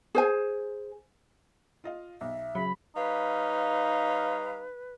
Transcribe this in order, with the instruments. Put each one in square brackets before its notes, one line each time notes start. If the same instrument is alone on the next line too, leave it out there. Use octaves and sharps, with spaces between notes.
[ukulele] G#4 C5 G#5
[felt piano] F4 D#5 F5
[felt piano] B1 [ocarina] E5
[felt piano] C#3 [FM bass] F#3 [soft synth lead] B5
[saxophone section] G3 C#5 F5 [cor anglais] D#4 [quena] B4